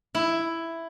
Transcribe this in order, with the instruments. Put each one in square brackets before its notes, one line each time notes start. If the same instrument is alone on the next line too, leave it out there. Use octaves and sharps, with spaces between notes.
[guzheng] E4